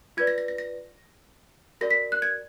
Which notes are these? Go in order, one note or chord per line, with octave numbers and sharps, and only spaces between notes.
F4 B4 D5 G#6
A#6
A#6
A#6
A#6
F#4 A#4 D5 A#6
B6
F#6
G#6